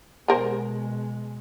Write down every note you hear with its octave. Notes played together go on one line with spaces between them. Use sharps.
B2 G#3 B3 A#4 C5